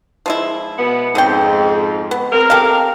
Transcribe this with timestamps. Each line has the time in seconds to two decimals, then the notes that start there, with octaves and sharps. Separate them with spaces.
0.26 F3 G#3 E4
0.79 B2 B3
1.15 F2 G#2 C#3 C4 G5
2.11 B3
2.33 G#3 C4 A#4
2.50 G4 A4 F5